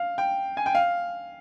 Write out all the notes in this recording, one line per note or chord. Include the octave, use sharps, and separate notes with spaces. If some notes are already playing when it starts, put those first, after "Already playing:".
Already playing: F5
G5
G#5
G5
F5